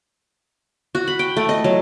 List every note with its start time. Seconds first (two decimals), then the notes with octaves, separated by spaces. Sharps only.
0.95 F#4
1.08 B5
1.19 G5
1.37 A3
1.49 D#5
1.64 F#3